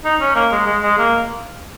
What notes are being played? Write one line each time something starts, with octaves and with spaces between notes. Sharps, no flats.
D#4
C#4
A#3
G#3
G#3
G#3
A#3